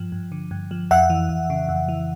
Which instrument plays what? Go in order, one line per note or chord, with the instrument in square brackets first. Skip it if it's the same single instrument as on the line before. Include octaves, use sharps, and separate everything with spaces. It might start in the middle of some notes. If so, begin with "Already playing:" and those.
Already playing: [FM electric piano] G2 F3
G2
D3
G2
F3
F2 E5 F#5
E3
F2
C#3
F2
E3